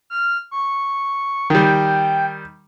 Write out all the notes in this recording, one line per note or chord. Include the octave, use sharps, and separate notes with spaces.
F6
C#6
D#3 G3 G5